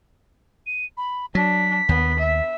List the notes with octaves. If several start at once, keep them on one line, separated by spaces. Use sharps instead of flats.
D#7
B5
F#3 D4 B6
D#2 B3
E5